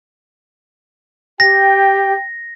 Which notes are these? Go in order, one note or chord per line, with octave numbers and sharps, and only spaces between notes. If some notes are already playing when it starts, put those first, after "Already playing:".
G4 G5 A#6